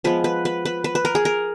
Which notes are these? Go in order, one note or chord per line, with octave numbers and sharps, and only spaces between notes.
F3 G#3 B3 B4
B4
B4
B4
B4
B4
A#4
G#4
A#4